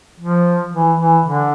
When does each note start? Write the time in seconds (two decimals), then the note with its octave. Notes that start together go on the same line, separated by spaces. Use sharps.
0.20 F3
0.74 E3
1.00 E3
1.26 D3